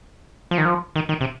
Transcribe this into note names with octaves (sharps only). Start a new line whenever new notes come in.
F3
D#3
F3
D#3
D#3
C3